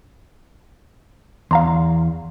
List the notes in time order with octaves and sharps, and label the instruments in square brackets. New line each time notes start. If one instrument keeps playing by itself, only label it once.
[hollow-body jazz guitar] E2 [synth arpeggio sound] F5 A#5 C6